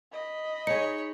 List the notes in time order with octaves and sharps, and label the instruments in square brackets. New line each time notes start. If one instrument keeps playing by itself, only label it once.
[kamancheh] D#5 B5
[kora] D#4 G#4 [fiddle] C#5 [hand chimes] C#7